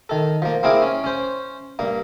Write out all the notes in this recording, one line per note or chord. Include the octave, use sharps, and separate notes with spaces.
D#3 A4
F3 A#3
A#3 C4 E4 G#4 F5 D6
C#4
C#4 C5
G2 A#3